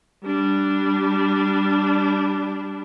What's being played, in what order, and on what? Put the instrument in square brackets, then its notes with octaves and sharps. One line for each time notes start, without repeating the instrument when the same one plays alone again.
[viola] G3 D4